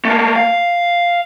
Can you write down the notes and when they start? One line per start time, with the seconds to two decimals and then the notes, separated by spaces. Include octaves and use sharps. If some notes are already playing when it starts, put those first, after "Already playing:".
0.05 A3 A#3
0.36 F5